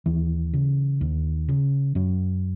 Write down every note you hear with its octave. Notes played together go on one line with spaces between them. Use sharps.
D#2 E3
C#3
D#2
C#3
F#2 F#3